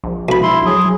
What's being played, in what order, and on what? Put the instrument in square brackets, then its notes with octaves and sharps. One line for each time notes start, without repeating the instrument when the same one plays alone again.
[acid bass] A#1
[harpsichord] B1 B5
[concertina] E4 C6
[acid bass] F#3 [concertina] G#4